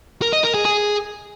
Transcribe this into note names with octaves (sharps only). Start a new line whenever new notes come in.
A#4
D#5
A#4
G#4
G#4